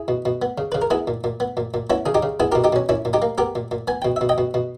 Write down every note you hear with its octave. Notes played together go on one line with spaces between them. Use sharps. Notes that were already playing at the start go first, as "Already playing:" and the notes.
Already playing: E4 G#4
B2
B2
B3
C#3
C#3 B4
A#4
B3 E4 G#4
A#2
A#2
B3
A#2
A#2
B3 C#4 E4
C#3 G#4
D#4 G4
C#3
B3 E4 G#4
B2 G4 A#4
D#4 G4
B2 C#4
A#2 C#4 E4
A#2
D#4 G4
A#3
B3 G4 A#4
A#2
A#2
B3 G#5
B2 G5
B2 E5
D#5 G5
B2
B2